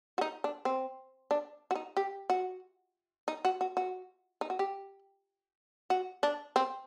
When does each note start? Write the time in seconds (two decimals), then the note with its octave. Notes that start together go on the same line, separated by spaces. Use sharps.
0.18 F#4
0.21 D#4
0.44 D4
0.65 C4
1.31 D4
1.71 F#4
1.75 D#4
1.97 G4
2.30 F#4
3.28 D#4
3.45 F#4
3.61 F#4
3.77 F#4
4.41 D#4
4.50 F#4
4.59 G4
5.90 F#4
6.23 D4
6.56 C4